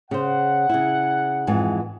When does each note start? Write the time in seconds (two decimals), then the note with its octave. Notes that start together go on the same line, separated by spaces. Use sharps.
0.11 C#3 C5 F#5
0.69 C#3 E4
1.47 F2 G#2 E3